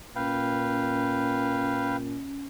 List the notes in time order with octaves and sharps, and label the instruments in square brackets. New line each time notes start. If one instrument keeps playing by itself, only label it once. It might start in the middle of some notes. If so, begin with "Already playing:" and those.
[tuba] A#2 [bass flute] C#4 [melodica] B4 F5 G5